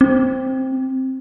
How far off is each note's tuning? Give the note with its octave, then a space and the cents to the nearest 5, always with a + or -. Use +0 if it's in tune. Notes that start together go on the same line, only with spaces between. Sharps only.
C4 +5